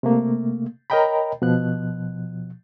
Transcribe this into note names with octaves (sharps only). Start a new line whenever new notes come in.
C3 A3 A#3
A#4 C#5 D#5 G5 A#5 B5
B2 F3 F#6